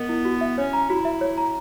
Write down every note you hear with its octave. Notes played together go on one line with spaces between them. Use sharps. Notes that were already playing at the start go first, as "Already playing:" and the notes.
Already playing: B3 A#4 D#5
E4
F#4
E5
C#4 C#5
A#5
E4 F#4
E5
C#5
A#5